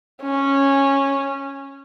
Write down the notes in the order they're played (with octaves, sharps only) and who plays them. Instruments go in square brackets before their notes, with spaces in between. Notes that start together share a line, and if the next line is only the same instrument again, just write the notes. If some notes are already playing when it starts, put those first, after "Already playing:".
[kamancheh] C#4